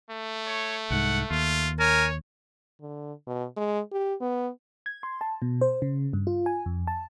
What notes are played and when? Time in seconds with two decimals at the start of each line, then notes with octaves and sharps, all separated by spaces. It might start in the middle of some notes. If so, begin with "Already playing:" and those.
0.11 A3
0.46 C#5
0.90 C2 G#2 F#5
1.31 D#2 F4
1.79 A#4 C#5 G#5
2.81 D3
3.27 B2
3.57 G#3
3.91 G4
4.21 B3
4.86 G#6
5.03 C6
5.21 A5
5.42 B2
5.61 C5
5.82 C#3
6.13 G2
6.27 F4
6.46 G#5
6.66 F2
6.87 A5